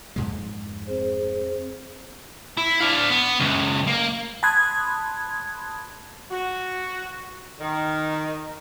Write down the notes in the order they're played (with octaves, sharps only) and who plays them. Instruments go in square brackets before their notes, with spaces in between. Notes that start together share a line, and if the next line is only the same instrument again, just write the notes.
[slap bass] F2 G#2 G#3
[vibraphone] C4 G#4 C5
[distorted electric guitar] E4
D4 F5
B3
C#2 F#2
A#3
[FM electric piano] A5 B5 C6 D#6 F#6 G#6
[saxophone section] F#4
D#3